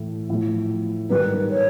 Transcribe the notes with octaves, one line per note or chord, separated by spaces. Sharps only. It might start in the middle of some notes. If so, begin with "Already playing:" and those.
Already playing: A2 E3 A3
A2 F3 A3
G#2 D#3 G3 A#3 B4
C#5